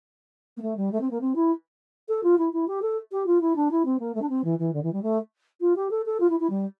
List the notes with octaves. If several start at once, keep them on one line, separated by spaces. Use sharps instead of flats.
A#3
A3
G3
A3
C4
A#3
C4
E4
A4
F4
E4
E4
G4
A4
G4
F4
E4
D4
E4
C4
A#3
A3
D4
C4
E3
E3
D3
E3
G3
A3
F4
G4
A4
A4
F4
E4
E4
G3